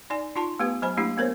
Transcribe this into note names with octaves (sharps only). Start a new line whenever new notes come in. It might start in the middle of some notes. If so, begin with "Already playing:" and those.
D#4 D5 G#5
D#4 F4 A5 C6
A3 B3 G4 B4
F#3 C5 G#5 B5
A3 A#3 D4 E4 G4
A3 B3 A#4 C5 C#5